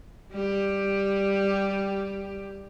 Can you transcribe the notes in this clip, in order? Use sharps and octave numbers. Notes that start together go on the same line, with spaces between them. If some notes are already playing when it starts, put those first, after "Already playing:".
G3 G4